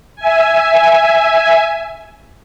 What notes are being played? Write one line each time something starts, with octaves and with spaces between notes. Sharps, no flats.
E5 G#5